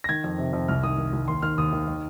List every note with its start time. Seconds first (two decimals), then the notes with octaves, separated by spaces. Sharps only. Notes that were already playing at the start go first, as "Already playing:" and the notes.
0.04 A#6
0.09 D#3 G#6
0.24 F2
0.38 C3
0.53 F2
0.68 C2 F6
0.83 D#3 D#6
0.98 D#3
1.13 C2
1.28 D#2 C6
1.42 D#3 F6
1.58 D#2 D#6
1.73 D#3
1.88 D#3